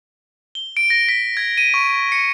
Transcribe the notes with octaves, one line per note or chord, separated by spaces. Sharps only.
G7
D7
A#6
B6
G#6
D#7
C#6
C#7